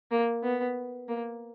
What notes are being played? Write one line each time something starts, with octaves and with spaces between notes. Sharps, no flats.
A#3
B3
A#3